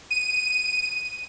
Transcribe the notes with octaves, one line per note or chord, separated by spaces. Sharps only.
D#7